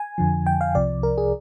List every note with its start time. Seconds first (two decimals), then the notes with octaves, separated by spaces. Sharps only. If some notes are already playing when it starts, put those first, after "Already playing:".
Already playing: G#5
0.18 F2 D3 F3
0.47 G5
0.61 F5
0.75 C2 C3 F3 D5
1.03 A#4
1.18 G#4